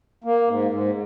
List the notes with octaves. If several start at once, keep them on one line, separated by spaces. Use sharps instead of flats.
A#3
G#2
G#2